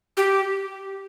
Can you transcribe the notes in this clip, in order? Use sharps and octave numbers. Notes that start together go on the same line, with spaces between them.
G4